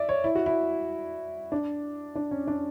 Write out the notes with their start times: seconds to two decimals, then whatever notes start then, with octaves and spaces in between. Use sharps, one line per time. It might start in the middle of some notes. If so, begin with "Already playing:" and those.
Already playing: D5 E5
0.09 C#5
0.24 E4
0.35 F#4
0.46 E4
1.52 D4
2.15 D4
2.31 C#4
2.47 D4